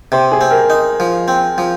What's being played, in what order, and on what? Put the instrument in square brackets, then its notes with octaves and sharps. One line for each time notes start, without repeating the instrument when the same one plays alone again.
[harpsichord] C3 [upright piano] C5
[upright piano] G#4
[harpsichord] C4
[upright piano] A#4
[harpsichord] D#4
F3
C4
F3